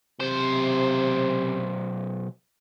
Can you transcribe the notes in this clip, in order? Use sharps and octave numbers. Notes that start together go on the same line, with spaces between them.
B1 C3 C5